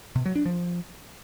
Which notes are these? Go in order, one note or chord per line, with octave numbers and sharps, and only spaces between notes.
B2
F#3
D4
F3